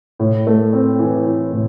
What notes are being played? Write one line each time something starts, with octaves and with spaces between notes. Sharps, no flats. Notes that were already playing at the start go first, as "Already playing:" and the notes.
A2
A3
C4
E3
E3
A2